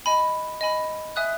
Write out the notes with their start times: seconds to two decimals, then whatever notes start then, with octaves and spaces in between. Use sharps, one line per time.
0.06 D#5 G#5 B5
0.61 D#5 G#5 B5
1.16 E5 G#5 D#6 F#6